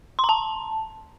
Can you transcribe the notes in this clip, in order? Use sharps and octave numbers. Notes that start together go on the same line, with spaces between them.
C6
A#5
A5